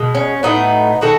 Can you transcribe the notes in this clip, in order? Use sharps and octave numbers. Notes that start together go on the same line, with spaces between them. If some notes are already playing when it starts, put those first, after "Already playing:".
Already playing: B2 G#3
C#4
A2 F#3 A3 B3 D#4
D#3 G#3 B3 F#4 A4